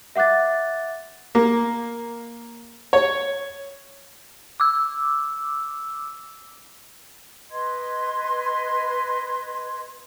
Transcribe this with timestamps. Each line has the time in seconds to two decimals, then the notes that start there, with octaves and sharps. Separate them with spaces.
0.16 E5 F#5 D6 F#6 A6
1.35 A#3
2.93 C#5
4.60 D6 E6
7.50 B4 D#5 C6 G#6